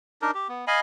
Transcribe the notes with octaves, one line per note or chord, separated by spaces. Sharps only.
D4 D#4 A#4
G4
B3
D#5 F5 G#5 B5